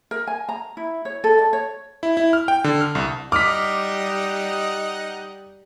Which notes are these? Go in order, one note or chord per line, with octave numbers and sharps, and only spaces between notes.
A#4
G#5
A#5
E4
C#5
A4
D5
C#5
E4
E4
F6
G5
D3
F6
C2
G3 D#4 D#5 F#5 D6 F6 B6